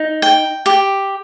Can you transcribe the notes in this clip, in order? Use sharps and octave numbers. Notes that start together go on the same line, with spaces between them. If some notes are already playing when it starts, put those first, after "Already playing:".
Already playing: D#4
G5
G4